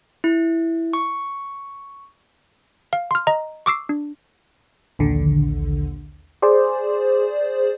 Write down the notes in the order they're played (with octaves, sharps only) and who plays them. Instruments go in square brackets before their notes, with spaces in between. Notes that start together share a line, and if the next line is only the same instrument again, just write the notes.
[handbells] E4
C#6
F5
C6 F6
D#5 A#5
C#6 D6 E6 C7
D4
[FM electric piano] A#1 D#2 D3
G#4 C5 D5